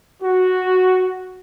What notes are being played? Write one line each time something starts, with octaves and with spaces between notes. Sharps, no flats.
F#4